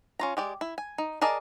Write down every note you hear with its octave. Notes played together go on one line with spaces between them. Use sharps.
C#4 F4 A#5
G#3 G4 D5
E4
G#5
D#4
G#4 A#4 D5 D#5 A5